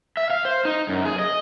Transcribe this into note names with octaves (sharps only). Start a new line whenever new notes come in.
E5
F5
C5
D#4
F#2
G#4
D#5